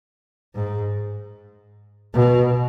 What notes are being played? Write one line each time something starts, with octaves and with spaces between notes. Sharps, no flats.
G#2
B2